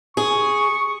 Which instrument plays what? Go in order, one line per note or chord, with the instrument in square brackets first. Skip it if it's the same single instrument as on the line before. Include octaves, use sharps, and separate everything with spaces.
[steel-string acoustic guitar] G#4 [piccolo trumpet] C#6